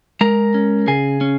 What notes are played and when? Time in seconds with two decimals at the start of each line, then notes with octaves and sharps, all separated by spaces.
0.21 G#3 A#4 A#5
0.54 C#4
0.88 C#3 G#4 G#5
1.21 C#4